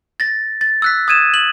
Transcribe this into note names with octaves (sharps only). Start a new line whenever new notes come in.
A6 A#6
A6
E6 F#6 B6
D#6 G#6 D#7 E7
F#7